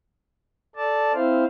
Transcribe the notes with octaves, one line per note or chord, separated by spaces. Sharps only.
A4 D5 A5
C4 E4 C5 F5